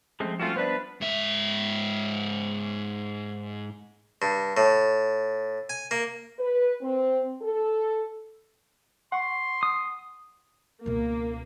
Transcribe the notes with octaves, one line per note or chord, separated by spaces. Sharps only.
F3 G#3 A3 C4 C#4
G3 A3 C4 C#4 F4 F#4
B3 D4 B4 C5 D5 E5
G#2 E5
G2
A2
G#5
A#3
B4
C4
A4
F#5 C6 C#6
D#6
C#2 B2 A#3